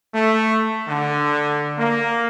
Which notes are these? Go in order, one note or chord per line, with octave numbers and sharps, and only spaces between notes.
A3
D3
A#3